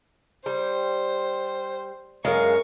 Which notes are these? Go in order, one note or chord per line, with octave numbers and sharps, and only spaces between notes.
G3 C5
F#2 G#3 A#4 F5 C#6